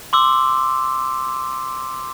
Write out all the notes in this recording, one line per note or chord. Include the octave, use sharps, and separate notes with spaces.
C6 D6 E6